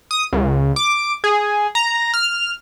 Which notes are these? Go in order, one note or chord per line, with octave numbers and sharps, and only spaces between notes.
D#6
C#2
D6
G#4
A#5
F6